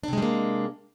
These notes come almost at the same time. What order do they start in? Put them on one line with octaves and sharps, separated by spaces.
D4 C3 G#3 G3 A#3